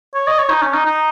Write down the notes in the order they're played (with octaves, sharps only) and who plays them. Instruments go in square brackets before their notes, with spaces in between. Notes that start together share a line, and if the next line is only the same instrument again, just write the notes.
[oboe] C#5
D#5
C#5
D#4
C#4
D#4
D#4